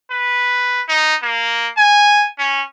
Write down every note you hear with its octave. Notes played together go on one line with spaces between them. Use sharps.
B4
D#4
A#3
G#5
C#4